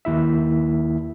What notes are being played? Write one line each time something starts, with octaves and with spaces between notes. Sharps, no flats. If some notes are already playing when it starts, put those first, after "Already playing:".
D#2 E4 E5